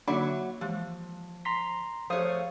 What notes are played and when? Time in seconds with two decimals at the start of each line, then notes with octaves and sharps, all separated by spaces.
0.08 D3 F#3 A#3 D#4 E5 B5 D6
0.61 E3 F3 G#3 G4
1.45 A#5 C6 B6
2.10 F3 A3 G4 G#4 C5 C#5 F5 D#6